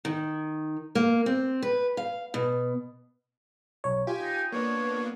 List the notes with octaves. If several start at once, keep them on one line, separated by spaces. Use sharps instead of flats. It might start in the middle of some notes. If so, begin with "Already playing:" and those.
D#3
A#3
C4
B4
F5
B2
B1 C#5
F4 G4 G#5
D#4
A#3 B3 D4 C#5